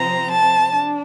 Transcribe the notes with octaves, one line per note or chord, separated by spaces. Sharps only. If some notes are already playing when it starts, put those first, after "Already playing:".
Already playing: C3 F3 C4 A#5
A5
D4